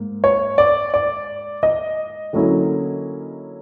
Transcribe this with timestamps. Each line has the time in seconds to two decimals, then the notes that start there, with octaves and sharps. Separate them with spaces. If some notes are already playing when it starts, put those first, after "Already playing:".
Already playing: G#2 A#3
0.24 C#5
0.58 D5
0.94 D5
1.63 D#5
2.33 D3 F#3 A#3 C#4 E4